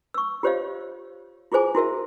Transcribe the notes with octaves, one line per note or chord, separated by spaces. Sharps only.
C#6 E6
F4 G4 C5 C#5 D#5 F5
E4 F4 G#4 C5 G#5 D6
E4 F#4 A#4 E5